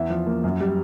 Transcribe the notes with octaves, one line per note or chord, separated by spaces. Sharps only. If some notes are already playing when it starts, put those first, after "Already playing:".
Already playing: E2 E5
F3
A#3
F#2
G3